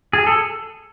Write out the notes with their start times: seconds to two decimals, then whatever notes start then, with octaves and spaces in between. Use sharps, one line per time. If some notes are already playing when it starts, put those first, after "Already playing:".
0.13 G#4
0.27 A4